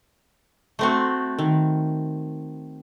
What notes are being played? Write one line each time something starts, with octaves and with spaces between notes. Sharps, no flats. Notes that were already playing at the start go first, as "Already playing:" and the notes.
A3 C4 F#4
D#3